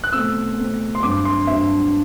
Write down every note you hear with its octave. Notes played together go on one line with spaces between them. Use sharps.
F#6
B2 A3 C4 E6
B2 A3 C4
C6
G2 F#3 C4 D6
C6
G2 F#3 C4 E5